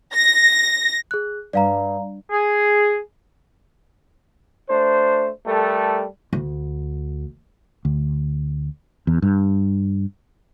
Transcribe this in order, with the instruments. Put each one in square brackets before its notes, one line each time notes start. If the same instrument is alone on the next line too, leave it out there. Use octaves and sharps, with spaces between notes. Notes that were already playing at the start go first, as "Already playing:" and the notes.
[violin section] A#6
[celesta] G#4 F#6
[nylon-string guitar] G2 [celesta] D5 F5 A#5
[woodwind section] G#4
[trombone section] A3 D4 C5
G3 A3 A4 A#4
[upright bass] D2
[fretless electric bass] D2
E2
G2